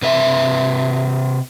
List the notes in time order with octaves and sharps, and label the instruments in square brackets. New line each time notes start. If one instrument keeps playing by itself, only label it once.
[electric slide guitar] C3 B4 E5